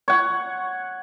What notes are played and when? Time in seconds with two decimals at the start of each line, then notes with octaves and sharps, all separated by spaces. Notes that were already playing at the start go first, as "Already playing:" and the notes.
0.08 C#5 F#5